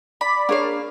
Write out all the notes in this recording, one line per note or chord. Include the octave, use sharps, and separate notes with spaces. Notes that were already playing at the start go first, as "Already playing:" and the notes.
D5 B5
A#3 D4 G#4 C#5 F5